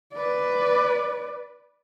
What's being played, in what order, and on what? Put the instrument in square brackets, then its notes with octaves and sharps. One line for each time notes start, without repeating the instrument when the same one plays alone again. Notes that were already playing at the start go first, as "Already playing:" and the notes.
[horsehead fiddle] B4 D5